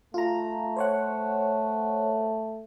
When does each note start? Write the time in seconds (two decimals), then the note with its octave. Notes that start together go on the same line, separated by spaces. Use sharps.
0.14 A3 F4 A#5
0.76 C5 C#5 F#5